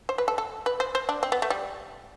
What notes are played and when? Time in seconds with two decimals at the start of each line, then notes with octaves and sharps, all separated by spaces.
0.09 C5
0.18 B4
0.28 A4
0.38 A4
0.66 B4
0.80 C5
0.95 C5
1.09 D4
1.23 C4
1.32 B3
1.42 A3
1.50 G3